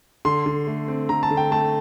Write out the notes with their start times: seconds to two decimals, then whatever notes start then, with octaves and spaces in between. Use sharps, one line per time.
0.25 D3 C6
0.46 D3
0.67 A3
0.88 C4
1.09 D3 A#5
1.23 A5
1.31 D3
1.37 G5
1.51 A3 A5